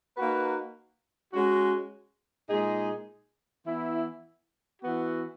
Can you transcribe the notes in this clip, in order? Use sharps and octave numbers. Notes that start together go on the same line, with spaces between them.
A#3 D#4 F#4 B4
G#3 C#4 F#4
A#2 G#3 D#4 G#4
E3 B3 E4
E3 B3 F#4